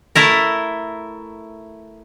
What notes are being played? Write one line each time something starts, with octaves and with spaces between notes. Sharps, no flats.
A3 E4 A#4